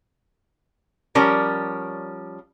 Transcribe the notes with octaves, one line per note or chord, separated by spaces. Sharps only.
F3 G3 C#4 A#4 D5